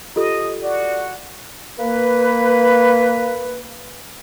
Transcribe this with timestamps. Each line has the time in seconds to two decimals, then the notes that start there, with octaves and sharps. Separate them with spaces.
0.16 F4 G4 A4 D#5
0.61 F#4 D5
1.78 A#3 B4